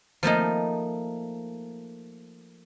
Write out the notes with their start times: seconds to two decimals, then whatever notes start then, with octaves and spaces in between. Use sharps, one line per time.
0.23 F3 A3 A#3 D#4